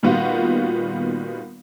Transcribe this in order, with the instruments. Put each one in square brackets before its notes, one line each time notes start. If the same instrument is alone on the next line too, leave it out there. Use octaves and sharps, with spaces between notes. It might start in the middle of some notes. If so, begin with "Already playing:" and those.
[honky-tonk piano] A#2 D#3 G3 B3 F4 F#4